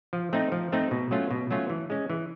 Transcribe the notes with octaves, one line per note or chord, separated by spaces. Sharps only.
F3
A3 C4 D#4
F3
A3 C4 D#4
B2
F#3 A3 C#4 F4
B2
F#3 A3 C#4 F4
E3
G#3 C#4
E3